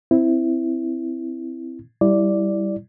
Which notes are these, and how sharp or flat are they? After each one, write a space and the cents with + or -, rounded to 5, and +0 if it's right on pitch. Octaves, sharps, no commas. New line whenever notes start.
C4 -5 E4 +0
G3 +0 E4 +0 D5 +0